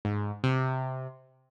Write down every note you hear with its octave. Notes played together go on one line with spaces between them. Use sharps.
G#2
C3